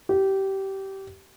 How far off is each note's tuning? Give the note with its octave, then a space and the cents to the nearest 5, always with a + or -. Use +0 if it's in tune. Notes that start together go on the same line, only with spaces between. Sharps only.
G4 -20